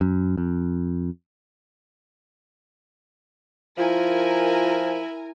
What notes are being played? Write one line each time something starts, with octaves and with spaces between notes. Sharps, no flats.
F#2
F2
F3 E4 F4 A#4 G#5